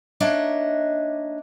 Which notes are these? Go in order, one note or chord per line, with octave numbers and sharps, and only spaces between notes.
A#3 D4 D#4 C#5 D#5 E5